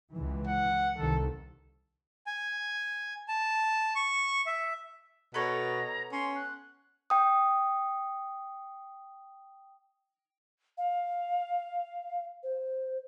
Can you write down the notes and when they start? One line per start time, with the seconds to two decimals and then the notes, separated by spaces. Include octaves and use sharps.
0.14 C#2 E3
0.47 F#5
0.97 C2 D#3 A4
2.26 G#5
3.28 A5
3.95 C#6
4.46 E5
5.34 B2 B3 A4 C#5 A#5
6.12 C#4 C6
6.36 F#6
7.10 G5 D#6
10.78 F5
12.43 C5